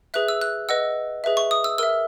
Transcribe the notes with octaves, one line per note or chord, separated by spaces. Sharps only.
G#4 B4 E5 F#6
E6
F#6
B4 D#5 F#5 E6
G#4 B4 E5
C#6
D#6
E6
A#4 E5 E6